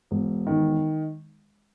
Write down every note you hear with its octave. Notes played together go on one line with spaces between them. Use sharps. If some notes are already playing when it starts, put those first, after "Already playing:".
E1
D#3